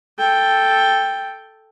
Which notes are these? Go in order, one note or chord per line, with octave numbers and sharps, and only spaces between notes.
A4 G5